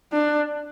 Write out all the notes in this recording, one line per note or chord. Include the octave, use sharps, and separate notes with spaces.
D4